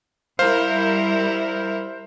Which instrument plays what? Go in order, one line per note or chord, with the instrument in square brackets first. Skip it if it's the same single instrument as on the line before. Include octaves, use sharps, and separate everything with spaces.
[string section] G3 E4 A#4 [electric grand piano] C5 F5